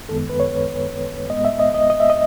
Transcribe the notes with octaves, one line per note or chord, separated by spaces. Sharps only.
F#2 D#3 G#3 B3 A4
B4
C#5
A2 G#3 B3 D#5
E5
D#5
D#5
D#5
E5
D#5